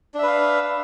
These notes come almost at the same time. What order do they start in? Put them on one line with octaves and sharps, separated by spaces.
D4 E5 B4 F5